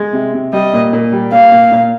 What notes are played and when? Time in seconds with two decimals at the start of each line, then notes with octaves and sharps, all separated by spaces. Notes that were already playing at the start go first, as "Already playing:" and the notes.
Already playing: G#3
0.13 C3
0.33 C3
0.53 G3 D#5
0.73 A#2
0.93 A#2
1.12 G3
1.32 A#2 F5
1.51 A#2
1.71 A#2